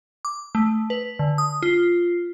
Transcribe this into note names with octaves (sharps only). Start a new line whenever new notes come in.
D6
A3
B4
D3
D#6
F4